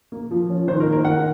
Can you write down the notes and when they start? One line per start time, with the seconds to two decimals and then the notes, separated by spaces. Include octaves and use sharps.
0.12 A#3
0.31 F3
0.50 C#4
0.67 D#3 C5
0.80 A#4
0.87 A#3
0.93 A#4
1.05 D#3 F#5